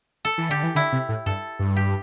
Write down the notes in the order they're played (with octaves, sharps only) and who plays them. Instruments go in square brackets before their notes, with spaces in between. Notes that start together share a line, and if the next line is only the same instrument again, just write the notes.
[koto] A4
[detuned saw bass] E3
[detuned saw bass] D3 [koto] G4
[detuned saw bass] E3
[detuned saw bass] D3 [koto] E4
[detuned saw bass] C3
A2
[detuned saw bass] G2 [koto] A4
[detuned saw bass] G2
[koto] G4